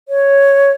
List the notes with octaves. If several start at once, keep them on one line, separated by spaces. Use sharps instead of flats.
C#5